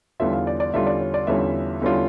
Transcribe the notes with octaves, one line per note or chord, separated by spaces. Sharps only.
E2 D3 G3 C#4 F4 E5
F5
D5
D5
E2 D3 G3 C#4 F4 E5
D5
C#5
D5
E2 D3 G3 C#4 F4 E5
E2 D3 G3 C#4 F4